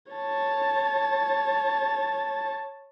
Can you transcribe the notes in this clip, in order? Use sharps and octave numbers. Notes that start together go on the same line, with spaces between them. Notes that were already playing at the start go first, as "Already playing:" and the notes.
C#5 A5